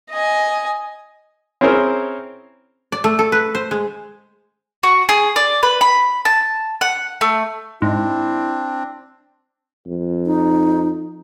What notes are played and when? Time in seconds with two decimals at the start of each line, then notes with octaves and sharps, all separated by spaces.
0.11 D#5 G#5
1.61 C4 C#4 E4 G#4 A#4 C5
2.92 D5
3.04 A3
3.19 A4
3.32 B4
3.55 C5
3.71 G#3
4.83 F#4
5.09 G#4
5.36 D5
5.63 B4
5.81 B5
6.25 A5
6.81 F#5
7.21 A3
7.82 G#2 C4 D4 E4
9.87 F2
10.26 D#4